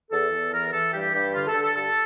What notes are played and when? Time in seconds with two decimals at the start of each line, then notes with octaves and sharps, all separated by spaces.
0.11 E2 A4
0.31 E2
0.52 E3 A#4
0.72 E3 A4
0.93 G2 G4
1.13 G2 G4
1.34 D3 F4
1.47 A4
1.55 D3
1.62 A4
1.76 G2 A4